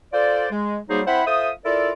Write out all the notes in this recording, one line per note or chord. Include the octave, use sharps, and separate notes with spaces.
F4 A4 C5 D5
G#3
F#3 G3 A#3 D#4 G#4 C5
C4 E4 C5 E5 F#5 B5
F4 A4 C5 E5 D#6
E4 F4 A4 A#4 D5